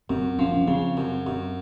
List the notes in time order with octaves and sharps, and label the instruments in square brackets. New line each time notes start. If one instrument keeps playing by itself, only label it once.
[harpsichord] F#2 [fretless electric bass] C4
[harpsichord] F3 [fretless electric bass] C#4
[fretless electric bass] C#4
[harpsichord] C#3 [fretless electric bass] C4
[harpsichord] F#2
F#2